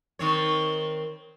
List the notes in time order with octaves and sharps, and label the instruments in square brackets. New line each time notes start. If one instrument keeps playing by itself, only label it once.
[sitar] D#3 C4 C#5